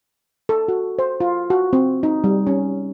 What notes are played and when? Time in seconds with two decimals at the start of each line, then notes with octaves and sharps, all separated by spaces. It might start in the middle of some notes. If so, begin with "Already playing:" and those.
0.49 A4
0.68 F#4
0.99 C5
1.20 F4
1.50 F#4
1.73 C4
2.03 D#4
2.24 G3
2.47 C#4